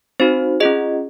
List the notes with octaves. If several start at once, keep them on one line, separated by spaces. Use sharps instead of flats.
C4 D#4 F#4 C5
C#4 F4 G#4 D#5